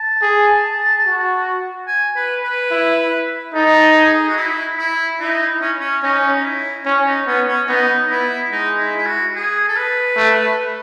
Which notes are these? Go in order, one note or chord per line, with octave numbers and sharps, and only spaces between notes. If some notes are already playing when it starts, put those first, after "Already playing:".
Already playing: A5
G#4
F#4
G#5
B4
B4
E4
D#4 A4
G#4
F#4
E4
E4
D#4 E4
C#4
C#4
C#4 D#4
D#4
E4
C#4
D#4
B3 C#4
C#4
B3 D#4
B3 E4
G#3 D#4
E4
E4
F#4
G#4
A4
B4
A3